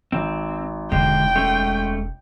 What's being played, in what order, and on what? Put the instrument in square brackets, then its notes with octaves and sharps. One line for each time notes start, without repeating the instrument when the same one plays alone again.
[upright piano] G#1 [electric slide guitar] C4
[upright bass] E1 [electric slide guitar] D3 G#3 [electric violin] G5
[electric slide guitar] G#3 A3 C#4